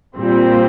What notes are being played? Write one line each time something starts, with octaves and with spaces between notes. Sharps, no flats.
A#2 G3 C4